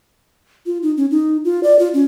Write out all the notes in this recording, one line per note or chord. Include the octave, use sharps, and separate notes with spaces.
F4
D#4
C#4
D#4
F4
D5
F4
C#4